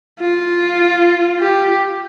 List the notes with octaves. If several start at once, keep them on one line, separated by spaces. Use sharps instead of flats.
F4
G4